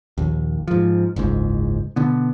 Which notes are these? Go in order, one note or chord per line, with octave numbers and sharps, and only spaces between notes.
A#1 D#2
G#2 F3
F#1 C#2 G#2
B2 D3 B3